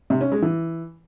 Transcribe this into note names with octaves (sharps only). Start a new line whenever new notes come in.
C3
C#4
G#3
E3